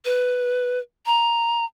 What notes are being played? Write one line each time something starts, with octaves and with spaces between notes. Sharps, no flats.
B4
A#5